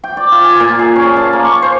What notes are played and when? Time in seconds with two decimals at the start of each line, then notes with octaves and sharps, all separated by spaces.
0.04 G5
0.17 D5
0.32 F4
0.44 G#5
0.60 A#2
0.79 G#4
0.96 C#4
1.17 A5
1.33 A#3
1.45 C#6
1.62 C5